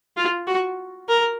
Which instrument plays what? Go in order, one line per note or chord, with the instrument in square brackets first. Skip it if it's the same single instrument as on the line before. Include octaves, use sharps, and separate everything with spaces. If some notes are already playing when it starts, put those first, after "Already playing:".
[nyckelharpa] F4
F#4
A#4